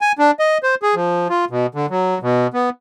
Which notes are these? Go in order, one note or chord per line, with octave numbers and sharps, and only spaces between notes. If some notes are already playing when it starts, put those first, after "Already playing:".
G#5
D4
D#5
C5
G#4
F3
F4
B2
D3
F#3
B2
B3